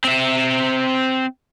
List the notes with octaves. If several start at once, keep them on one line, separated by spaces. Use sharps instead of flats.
C4 E5